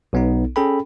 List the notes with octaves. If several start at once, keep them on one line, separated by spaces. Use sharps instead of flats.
B1 B3 D#4
C#4 G#4 A4 G5 B5